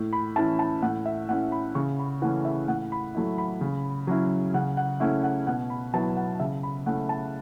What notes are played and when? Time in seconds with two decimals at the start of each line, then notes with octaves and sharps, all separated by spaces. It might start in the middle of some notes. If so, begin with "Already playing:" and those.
Already playing: A2
0.13 B5
0.36 E3 C#4 E4 A5
0.59 A5
0.82 A2 F#5
1.06 E5
1.29 A3 C#4 E4 F#5
1.52 B5
1.75 C#3 C#6
1.99 B5
2.22 E3 A3 C#4 F#5
2.45 E5
2.68 A2 F#5
2.92 B5
3.15 F#3 A3 E4
3.38 B5
3.61 C#3
4.07 F#3 C#4 E4
4.54 C#3 F#5
4.77 F#5
5.00 A3 C#4 E4 F#5
5.24 F#5
5.47 B2 F#5
5.70 B5
5.93 F#3 B3 E4 A5
6.17 F#5
6.40 C#3 E5
6.63 B5
6.86 A3 C#4 E4 F#5
7.09 A5